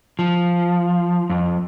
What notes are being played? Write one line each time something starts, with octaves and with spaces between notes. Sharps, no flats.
F3
F2